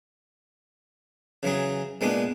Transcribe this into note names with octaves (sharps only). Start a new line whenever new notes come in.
C#3 E3 F#3 G#4
A#2 G#3 B3 D4